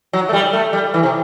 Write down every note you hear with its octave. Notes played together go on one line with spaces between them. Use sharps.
F#3
A3
G3
A3
G3
E3
C3